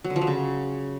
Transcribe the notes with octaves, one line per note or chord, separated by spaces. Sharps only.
F#3
D3
F3
F#3
C#3